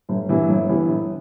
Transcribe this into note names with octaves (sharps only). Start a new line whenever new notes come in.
G1
G2 E3 B3 E4
G1
G2 E3 B3 E4
G1